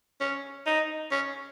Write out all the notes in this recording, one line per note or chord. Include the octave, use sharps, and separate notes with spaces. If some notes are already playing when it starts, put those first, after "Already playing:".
C#4
D#4
C#4